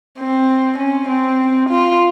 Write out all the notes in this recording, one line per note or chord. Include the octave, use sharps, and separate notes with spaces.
C4
C#4
C4
F4